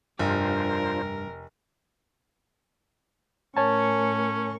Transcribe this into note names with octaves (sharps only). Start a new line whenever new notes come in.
F1 G2 D4 F4 A#4 C5
A2 C#4 A#4 C#5 G#5 A5 C#6